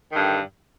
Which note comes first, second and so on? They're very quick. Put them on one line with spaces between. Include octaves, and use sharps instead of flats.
D#3 G2 D3